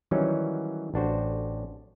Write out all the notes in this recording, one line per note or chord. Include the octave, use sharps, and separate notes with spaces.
D#3 E3 F#3 G3 C#4 D#4
A1 D4 F#4 C5